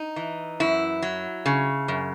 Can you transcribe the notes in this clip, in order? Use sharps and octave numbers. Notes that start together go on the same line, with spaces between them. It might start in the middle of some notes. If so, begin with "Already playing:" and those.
Already playing: D#4
E3
F#2 E4
F#3
C#3
F#2